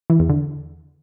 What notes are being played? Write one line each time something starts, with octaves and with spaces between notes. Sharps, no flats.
E3
E2
D3